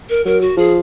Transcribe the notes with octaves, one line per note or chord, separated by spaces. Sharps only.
A#4
F#3 A#4
F#4
F3 G#4